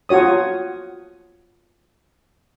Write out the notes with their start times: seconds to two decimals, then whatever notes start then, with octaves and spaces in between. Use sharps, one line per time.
0.09 F4 F#4 C#5 D#6